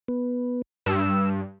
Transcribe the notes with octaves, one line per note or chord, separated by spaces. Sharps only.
B3
G2 E6